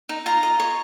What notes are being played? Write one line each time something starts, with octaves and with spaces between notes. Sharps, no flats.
D#4
F4 A#5
D#5
C#5